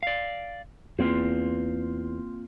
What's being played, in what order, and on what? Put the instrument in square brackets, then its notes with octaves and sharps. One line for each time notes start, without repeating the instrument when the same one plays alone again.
[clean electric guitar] D5 F5
[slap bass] E2 [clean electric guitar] A#3 C4 F4